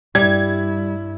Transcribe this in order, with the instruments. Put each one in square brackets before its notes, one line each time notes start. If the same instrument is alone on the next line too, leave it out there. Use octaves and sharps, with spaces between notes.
[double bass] G2 E4 [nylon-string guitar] G3 [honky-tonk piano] G#6